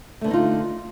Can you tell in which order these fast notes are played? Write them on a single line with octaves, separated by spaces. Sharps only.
A3 D3 B3 D#4 F4